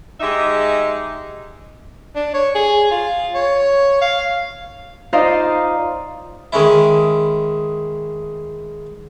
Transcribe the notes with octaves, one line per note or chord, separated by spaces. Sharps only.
G#3 D#4 G4 D#5 E5
D4
C#5
G#4
F4
C#5
F5
D#4 F4 C5 D5 D#5 F5
D#3 G#3 C#4 E4